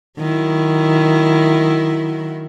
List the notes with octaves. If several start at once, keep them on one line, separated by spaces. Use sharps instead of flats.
D#3 F#3 E4